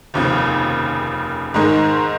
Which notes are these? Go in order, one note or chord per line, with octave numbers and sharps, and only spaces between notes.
F1 D#2 C#3 F3
G#2 D#3 G#3 D#4